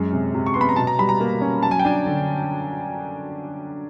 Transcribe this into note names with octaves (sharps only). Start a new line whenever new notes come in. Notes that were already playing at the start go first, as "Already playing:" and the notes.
Already playing: F#2 G#3
C3
C3
C#6
B3 C6
B5
A#5
B2 A5
A#5
G3 B5
A#5
A#3
C#4
F#3 A5
G#5
G5
D4 G#5
D3